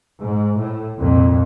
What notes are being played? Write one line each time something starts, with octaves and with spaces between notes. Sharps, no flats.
G#2
A2
C2 F2 A#2